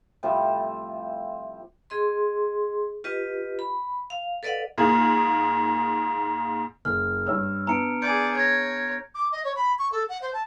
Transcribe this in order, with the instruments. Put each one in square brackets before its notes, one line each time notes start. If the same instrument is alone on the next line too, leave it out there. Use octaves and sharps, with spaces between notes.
[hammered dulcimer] A2 C3 F3 G3
[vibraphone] G#4 D#5 C6
F4 G4 B4 D#5
B5
F5
A4 B4 D5 D#5 F5 F#5
[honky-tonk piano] G#2 A#3 F4 G#4
[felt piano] F#1 [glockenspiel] F6
[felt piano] G2 C#5 E6
[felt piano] B3 D4 [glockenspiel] A#5 C#7 D7
[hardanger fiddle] G#4 D5 [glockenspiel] G6 C#7 D7
[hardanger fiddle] C#5 [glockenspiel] G#6 A#6
[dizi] D6
D#5
C#5
B5
C#6
A4
F#5
C5
A5